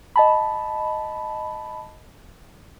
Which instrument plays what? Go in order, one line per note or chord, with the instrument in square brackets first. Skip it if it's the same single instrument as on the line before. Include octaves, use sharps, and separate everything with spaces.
[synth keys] D#5 A5 B5